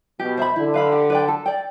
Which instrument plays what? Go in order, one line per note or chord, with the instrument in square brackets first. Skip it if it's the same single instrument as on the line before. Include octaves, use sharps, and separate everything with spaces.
[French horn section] B2 [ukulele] G4
[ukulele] C5 E5 B5
[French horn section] D3 [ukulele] E4
[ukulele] B4 F5 B5
G4
B4 D5 G5
A4
D5 G5